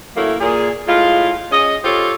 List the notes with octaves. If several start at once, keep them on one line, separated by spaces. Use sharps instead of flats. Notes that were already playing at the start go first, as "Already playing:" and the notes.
F#3 A3 A#3 C#4 E4
A#2 G#4
A2 G#3 F4
C#4 G#4 D#5
F4 G4 A4 C5 C#5